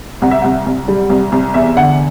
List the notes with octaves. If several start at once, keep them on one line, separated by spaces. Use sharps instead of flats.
C2 F#5
E5
C2 F#5
C2
G3
C2
C2
E2 E5
D3 F#5